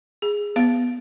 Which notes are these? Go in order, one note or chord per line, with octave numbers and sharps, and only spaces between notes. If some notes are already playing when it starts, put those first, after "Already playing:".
G#4
B3 F5